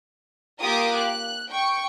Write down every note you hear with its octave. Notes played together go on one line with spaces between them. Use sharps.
A#3 F4 G4 A#4 D6 D#6
F#6
G5 C#6